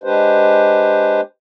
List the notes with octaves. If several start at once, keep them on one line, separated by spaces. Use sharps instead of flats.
G#3 D4 G4 B4 C5